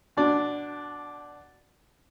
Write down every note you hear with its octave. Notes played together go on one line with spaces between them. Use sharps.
B2 D4